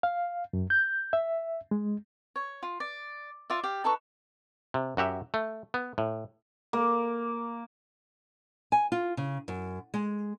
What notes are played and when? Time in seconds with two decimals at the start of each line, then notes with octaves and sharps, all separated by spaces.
0.03 F5
0.53 F#2
0.70 G6
1.13 E5
1.71 G#3
2.36 C#5
2.63 F4
2.80 D5
3.50 F4 D5 E5
3.64 G4 F5
3.84 D#4 A4 B4 C#6
4.74 C3
4.97 F#2 F#4 G4 E5
5.34 A3
5.74 B3
5.98 A2
6.73 A#3
8.72 G#5
8.92 F4
9.17 C#3
9.48 F#2
9.94 G#3